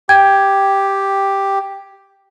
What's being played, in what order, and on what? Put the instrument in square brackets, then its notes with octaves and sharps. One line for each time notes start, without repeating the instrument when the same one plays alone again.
[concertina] G4 [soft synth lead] G5 [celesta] G#6